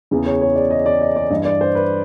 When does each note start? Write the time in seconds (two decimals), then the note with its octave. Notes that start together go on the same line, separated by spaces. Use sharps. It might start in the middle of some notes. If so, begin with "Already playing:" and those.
0.11 E2 C#3 E3
0.26 C#5
0.42 C#5
0.56 D5
0.71 D#5
0.86 D5
1.01 D#5
1.16 D5
1.30 G2 E3 D#5
1.45 D5
1.61 C5
1.75 B4